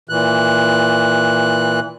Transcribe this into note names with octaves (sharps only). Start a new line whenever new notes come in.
A#2 E3 F#6